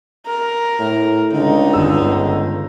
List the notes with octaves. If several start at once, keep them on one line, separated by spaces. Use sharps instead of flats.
A#4
A2
C#2 D3 D#4
G1 G#3 E6